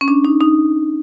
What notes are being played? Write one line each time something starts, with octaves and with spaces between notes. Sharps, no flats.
C#4
D4
D#4
D#4